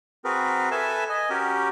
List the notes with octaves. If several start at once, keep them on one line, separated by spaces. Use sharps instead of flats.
C4 F#4 G#4 A#4 B4
A4 B4 E5 G#5 A5
D#5 G#5
C#4 F#4 G4 A#4